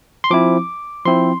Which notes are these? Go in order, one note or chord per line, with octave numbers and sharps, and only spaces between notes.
C6
F3 C4 E4 D6
F3 C4 E4 C6